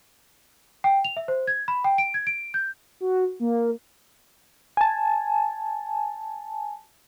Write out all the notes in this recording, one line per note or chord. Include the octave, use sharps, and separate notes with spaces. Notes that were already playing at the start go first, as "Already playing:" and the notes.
G5
F7
E5
C5
G#6
B5
G5
D7
G#6
D7
G6
F#4
A#3
G#5 A5